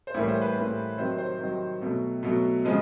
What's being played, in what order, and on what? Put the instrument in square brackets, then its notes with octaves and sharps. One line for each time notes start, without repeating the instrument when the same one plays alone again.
[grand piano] C5
A2 E3 G3 A#3 C#5
C5
B4
A2 E3 G3 A#3
C3 D#3 F#3 C5
C5
C3 D#3 F#3
B2 F#3 A3
B2 F#3 A3
C#3 F3 G#3